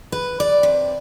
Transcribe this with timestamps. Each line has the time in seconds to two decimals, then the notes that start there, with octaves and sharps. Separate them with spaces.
0.12 B4
0.40 D5
0.63 C3